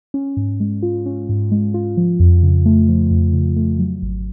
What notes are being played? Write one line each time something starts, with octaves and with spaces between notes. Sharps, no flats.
C#4
G#2
G#3
F4
C#4
G#2
G#3
F4
F3
F2
C#3
A3
F3
F2
C#3
A3
F#3
G#1